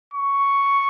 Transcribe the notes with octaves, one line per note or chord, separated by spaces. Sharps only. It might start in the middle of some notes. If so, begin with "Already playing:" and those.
C#6